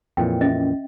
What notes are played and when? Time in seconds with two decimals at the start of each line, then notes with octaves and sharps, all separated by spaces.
0.17 F2 A#2 E3 G5
0.41 C#4 D#5 E5